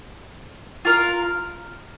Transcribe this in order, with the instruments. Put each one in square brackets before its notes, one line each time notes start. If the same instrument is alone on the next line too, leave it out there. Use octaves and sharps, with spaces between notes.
[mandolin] F4 A#4 F5